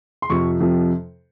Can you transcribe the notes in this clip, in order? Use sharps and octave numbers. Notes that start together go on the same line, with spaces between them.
C6
F2 C3 F3 C#6
F2 C3 F3